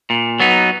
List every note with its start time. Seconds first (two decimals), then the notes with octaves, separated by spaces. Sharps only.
0.10 A#2
0.40 F#3 B3 D#4